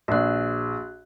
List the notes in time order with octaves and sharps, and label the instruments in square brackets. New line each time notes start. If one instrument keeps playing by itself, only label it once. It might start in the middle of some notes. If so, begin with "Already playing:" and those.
[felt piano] A#1 [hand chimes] F#4 F#6